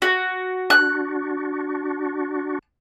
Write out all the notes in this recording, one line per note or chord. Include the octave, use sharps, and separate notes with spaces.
F#4
D4 F#4 F#6